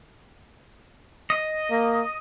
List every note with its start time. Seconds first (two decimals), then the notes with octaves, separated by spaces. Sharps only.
1.30 D#5
1.71 A#3